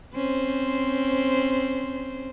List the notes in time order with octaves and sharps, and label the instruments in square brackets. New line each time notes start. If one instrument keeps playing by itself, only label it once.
[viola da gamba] C4 C#4 C5